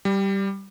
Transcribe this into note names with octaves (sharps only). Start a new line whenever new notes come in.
G3